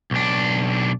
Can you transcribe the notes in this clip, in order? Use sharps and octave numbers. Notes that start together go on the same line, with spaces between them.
B1 D4